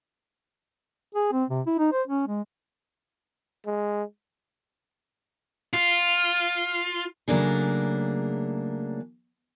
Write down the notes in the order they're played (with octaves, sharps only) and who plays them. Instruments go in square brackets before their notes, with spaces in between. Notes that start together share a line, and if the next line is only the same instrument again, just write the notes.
[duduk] G#4
C4
C3
E4
D#4
C5
C#4
G#3
[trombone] G#3
[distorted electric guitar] F4
[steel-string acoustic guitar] C#3 F#3 A3 A#3 D4 G#4